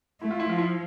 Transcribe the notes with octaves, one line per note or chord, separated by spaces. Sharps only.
A3 E4
F4
E4
F3 F4
E4